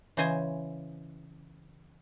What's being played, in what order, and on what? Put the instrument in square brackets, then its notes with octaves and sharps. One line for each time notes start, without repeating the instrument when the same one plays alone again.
[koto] C#3 E3 C5 D#5 G#5